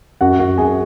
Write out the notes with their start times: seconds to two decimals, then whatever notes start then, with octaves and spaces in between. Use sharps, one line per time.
0.21 F#2 F#4 F#5
0.40 F#4 F#5
0.58 F#2 G#4 G#5